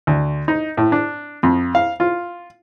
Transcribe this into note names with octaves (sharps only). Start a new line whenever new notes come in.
D2
D#4
A2
D4
F2
F5
F4